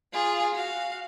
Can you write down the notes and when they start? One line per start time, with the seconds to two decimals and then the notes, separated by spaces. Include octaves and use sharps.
0.13 F4 G#4
0.55 F#4 F5